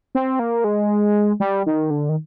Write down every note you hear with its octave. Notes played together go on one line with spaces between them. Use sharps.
C4
A#3
G#3
G3
D#3
D3
D#3